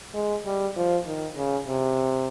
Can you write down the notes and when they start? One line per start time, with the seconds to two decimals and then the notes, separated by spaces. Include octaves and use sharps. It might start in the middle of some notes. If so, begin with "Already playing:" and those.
0.15 G#3
0.46 G3
0.76 F3
1.06 D#3
1.37 C#3
1.67 C3